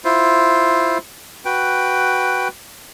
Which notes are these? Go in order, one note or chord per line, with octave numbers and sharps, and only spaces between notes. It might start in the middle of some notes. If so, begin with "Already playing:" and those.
E4 F4 C5
F#4 B4 G5